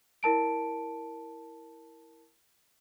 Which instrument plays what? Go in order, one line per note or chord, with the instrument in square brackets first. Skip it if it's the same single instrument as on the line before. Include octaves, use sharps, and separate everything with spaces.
[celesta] E4 A#4 A5 D7